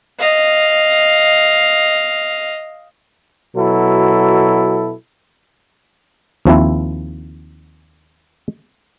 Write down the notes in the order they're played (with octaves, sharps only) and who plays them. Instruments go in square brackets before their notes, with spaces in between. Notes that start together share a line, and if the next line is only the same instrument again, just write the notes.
[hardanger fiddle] D#5 F5
[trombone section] B2 F#3 E4 A4
[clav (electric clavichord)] D#2 F3 C4 E4